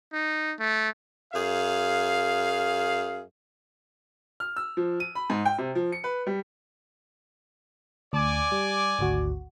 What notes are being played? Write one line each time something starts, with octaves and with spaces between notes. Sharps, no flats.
D#4
A3
F#2 G#4 F5
F6
E6
F3
D#7
B5
G#2
G5
C3
F3
C#7
B4
G3
D2 D5 G#5 D6
G3
G#1 D2 F#4